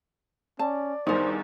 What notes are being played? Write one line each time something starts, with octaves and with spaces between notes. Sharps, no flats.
C#4 D5 A5
E2 G2 D#3 D#4 A#4 C5